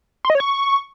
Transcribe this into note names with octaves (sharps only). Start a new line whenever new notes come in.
C6
D#5
C#5
C#6